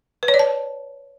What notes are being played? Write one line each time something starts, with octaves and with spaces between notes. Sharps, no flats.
B4
C#5
D5
A5